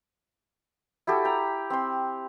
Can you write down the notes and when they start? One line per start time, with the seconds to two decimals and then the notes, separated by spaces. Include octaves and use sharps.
1.07 E4 F#4 G4 A4
1.25 G5 A#5
1.70 C4 C6